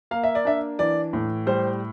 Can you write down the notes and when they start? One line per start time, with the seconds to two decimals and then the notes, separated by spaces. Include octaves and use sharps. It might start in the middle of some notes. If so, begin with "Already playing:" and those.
0.11 A#3 F5
0.24 E5
0.35 D5
0.45 D4 E5
0.79 E3 D5
1.13 A2
1.47 G3 C5